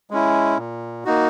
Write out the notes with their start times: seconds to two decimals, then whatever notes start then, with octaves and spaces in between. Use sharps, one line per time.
0.11 G#3 C#4 E4
0.57 A#2
1.05 A#3 D#4 F#4